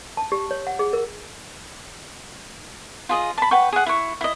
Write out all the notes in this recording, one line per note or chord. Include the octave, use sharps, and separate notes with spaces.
A5
G4
C#5
F#5
G#4
A#4
F4 G#4 D#5
A5 B5
B4 F#5 G5 C#6
G#4 F#5
E4 C#6
E4 D#5